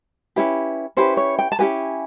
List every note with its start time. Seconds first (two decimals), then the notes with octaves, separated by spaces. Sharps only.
0.36 C#4 E4 G4 B4
0.97 C#4 E4 G4 B4 C5
1.17 C#5
1.39 G5
1.52 A5
1.59 C#4 E4 G4 B4 G#5